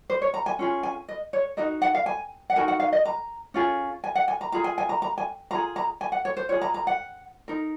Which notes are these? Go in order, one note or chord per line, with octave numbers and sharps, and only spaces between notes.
C5
C#5
A#5
G#5
C#4 F4 G#4
G#5
D#5
C#5
D#4 F#4 A#4 D#5
F#5
F5
G#5
F#5
D#4 F#4 A#4 G#5
F#5
F5
D#5
A#5
C#4 F4 G#4
G#5
F#5
G#5
A#5
F4 G#4 A#5
G#5
G#5
A#5
A#5
G#5
F4 G#4 A#5
A#5
G#5
F#5
C#5
C5
F4 G#4 C#5
A#5
A#5
F#5
D#4 A#4